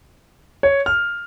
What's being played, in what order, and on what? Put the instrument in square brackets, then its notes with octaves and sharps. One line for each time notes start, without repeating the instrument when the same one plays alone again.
[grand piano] C#5
F6